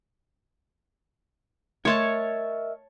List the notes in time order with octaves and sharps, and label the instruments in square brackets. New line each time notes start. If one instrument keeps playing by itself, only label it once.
[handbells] A3 C6 G#6 [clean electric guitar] A#4 D#5 E5 [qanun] C#5 A5